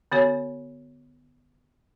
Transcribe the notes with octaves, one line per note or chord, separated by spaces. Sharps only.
D3 B3 F#4 C#5